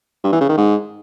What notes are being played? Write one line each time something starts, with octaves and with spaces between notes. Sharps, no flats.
G2
E3
C#3
D#3
G#2